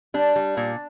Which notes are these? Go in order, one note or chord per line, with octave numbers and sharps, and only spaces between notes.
G3 D4
G3
A#2